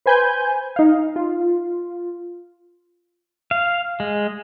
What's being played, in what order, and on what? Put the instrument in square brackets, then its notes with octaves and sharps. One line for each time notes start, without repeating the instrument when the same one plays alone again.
[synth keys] B4 C5 G#5 B5 G6
D#4 F5
F4
[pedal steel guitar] F5
G#3